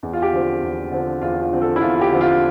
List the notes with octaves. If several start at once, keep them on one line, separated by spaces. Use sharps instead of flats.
E2
F4
G4
D3 F3 C4
E2
D3 F3 C4
E2 F4
F4
D3 F3 C4
A4
E4
E2 F4
F4
G4
D3 F3 C4
F4